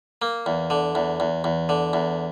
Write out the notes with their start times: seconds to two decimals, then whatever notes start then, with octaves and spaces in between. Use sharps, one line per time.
0.22 A#3
0.46 E2
0.70 D3
0.95 E2
1.20 E2
1.44 E2
1.69 D3
1.93 E2